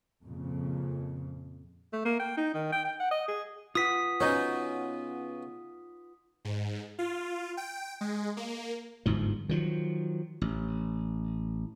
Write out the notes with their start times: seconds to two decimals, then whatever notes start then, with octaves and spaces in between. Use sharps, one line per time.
0.24 F2 A#2 C#3
1.93 A3
2.05 A#3
2.20 G5
2.37 D#4
2.54 D#3
2.72 G5
2.85 G5
3.00 F#5
3.11 D#5
3.28 G#4
3.75 F4 B4 F#5 D#6 B6
4.20 C#3 B3 C#4 D#4 F#4
6.45 G#2
6.99 F4
7.57 G5
8.01 G#3
8.37 A#3
9.06 G1 D2 G#2 F3
9.49 D#3 F3 F#3
10.41 A1